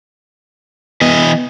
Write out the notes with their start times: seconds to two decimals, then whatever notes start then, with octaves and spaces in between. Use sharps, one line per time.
1.02 E3 B3 D#5